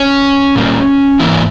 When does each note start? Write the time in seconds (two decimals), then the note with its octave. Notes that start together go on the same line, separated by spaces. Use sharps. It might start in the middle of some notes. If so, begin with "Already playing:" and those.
Already playing: C#4
0.55 A#2 G3 A#3
1.19 G#2 E3 A#3 E4